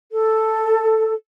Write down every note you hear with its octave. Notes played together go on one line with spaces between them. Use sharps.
A4